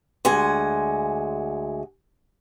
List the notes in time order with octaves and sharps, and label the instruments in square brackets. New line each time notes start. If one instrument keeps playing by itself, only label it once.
[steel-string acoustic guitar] D2 G#3 F#5 G#5